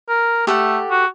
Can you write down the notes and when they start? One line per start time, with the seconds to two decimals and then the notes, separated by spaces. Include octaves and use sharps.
0.09 A#4
0.47 A3 G4 A4 F#5
0.91 F#4